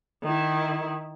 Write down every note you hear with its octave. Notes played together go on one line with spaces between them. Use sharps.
D#3 E4